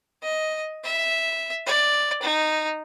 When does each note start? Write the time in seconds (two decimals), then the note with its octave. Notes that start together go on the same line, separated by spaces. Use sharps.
0.23 D#5
0.84 E5
1.66 D5
2.23 D#4